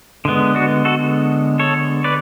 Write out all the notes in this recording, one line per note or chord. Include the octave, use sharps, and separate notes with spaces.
D3 G#3 B3
D4 F#4
F#4 A4
A4 C#5
B4 D5